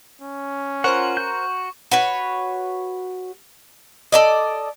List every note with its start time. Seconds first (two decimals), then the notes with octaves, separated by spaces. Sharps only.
0.22 C#4
0.84 F4 A#4 C5 F#5 C#6 F#6
1.17 F#4 G6
1.91 F#4 B4 C#5
4.12 A4 D5 D#5